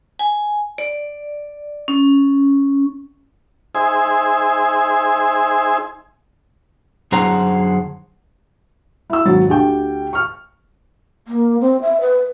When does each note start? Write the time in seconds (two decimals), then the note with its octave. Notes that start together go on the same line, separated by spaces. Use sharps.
0.19 G#5
0.78 D5
1.88 C#4
3.75 D#4 G#4 C5 E5 G#5
7.12 F#2 D3 G#4 C5 F#5 A#5
9.10 E4 E6
9.25 G#1 F#3 A6
9.48 D2 G4 G5
10.13 C#6 F6
11.28 A#3
11.61 C4
11.82 E5
12.01 B4